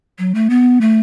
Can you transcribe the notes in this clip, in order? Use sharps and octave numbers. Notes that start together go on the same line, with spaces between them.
F#3
A3
B3
A3